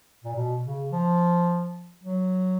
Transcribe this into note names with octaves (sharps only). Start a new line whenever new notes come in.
A#2
B2
C#3
F3
F#3